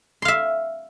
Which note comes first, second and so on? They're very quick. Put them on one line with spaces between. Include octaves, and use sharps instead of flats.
C6 F5 E5